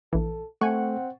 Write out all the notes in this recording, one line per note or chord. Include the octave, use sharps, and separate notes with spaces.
A#1 E3 A4
A3 C4 F#5 G#5 C#6